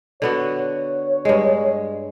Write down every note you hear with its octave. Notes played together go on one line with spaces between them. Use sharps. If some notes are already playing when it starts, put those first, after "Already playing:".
D3 B3 F#4 C#5
G2 G#3